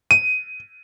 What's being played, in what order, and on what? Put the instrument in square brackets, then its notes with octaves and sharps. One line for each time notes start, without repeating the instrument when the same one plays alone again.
[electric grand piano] D#7